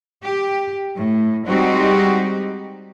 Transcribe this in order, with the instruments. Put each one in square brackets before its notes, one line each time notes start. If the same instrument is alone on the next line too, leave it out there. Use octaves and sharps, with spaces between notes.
[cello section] G4
A2
G3 G#3 C4 D#4 F#4 G4